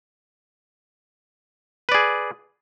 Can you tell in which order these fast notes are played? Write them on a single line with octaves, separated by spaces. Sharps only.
B4 D5 G#4